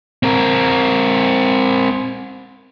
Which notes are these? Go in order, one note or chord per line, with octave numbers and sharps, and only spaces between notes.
C4 A#4